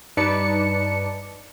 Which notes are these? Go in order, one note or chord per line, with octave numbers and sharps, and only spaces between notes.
G2 D#4 B4 D5 A5 C#7